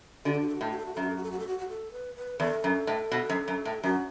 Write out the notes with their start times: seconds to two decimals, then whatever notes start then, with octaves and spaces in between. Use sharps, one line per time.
0.25 D3 F#4
0.32 A4
0.40 F#4
0.48 A4
0.55 F#4
0.61 A2 A4
0.71 F#4
0.78 A4
0.85 F#4
0.93 A4
0.97 F#2 F#4
1.09 A4
1.17 F#4
1.23 A4
1.31 F#4
1.39 A4
1.47 F#4
1.58 F#4
1.69 A4
1.92 B4
2.15 B4
2.40 E2 A4
2.64 F#2
2.87 A2
3.12 B2
3.29 F#2
3.48 F#2
3.65 A2
3.83 F#2 F#4